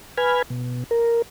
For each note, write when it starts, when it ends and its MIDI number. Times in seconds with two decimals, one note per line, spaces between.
0.18 0.42 71
0.18 0.42 80
0.18 0.42 83
0.18 0.42 89
0.18 0.42 92
0.50 0.84 47
0.91 1.22 70